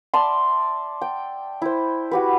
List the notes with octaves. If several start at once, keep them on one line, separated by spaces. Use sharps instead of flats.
D5 E5 A5 C6
G5
E4 C5
F#4 G4 B4